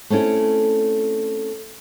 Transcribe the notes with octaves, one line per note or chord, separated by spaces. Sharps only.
A3 C4 C#4 E4 A4